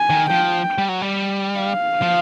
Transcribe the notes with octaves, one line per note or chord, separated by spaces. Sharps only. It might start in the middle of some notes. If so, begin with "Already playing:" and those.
Already playing: G#5
D#3
F3 G5
G3
F#3
G3
F5
F3